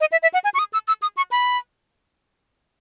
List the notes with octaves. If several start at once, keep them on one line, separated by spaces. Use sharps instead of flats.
D#5
E5
E5
F#5
G#5
C#6
D#6
E6
E6
D#6
C#6
B5